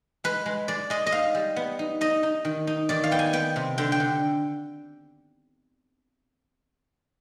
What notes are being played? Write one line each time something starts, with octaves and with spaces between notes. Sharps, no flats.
G#3 B4
G#3
G#3 D5
G#3 D#5
D#5
D#4 F5
G3
B3
D#4
D#4 D#5
D#4
D#3
D#4
D#3 D5
F5
B3 G5
G#5
B3 G5
C3
D3 G5
G5
D3